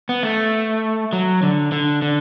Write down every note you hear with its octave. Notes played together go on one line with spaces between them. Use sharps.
B3
A3
F#3
D3
D3
D3